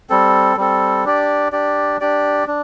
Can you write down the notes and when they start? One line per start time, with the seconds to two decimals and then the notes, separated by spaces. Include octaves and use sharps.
0.10 G3 C4 A4
0.57 G3 C4 A4
1.05 D4 G4 D5
1.52 D4 G4 D5
2.00 D4 G4 D5
2.47 D4